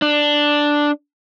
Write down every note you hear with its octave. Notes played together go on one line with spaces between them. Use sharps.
D4